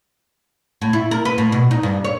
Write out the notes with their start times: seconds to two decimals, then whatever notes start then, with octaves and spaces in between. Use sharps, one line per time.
0.81 A2
0.93 E4
1.11 A#4
1.25 B4
1.38 A2
1.52 B2
1.71 D#4
1.83 G2
2.04 C#5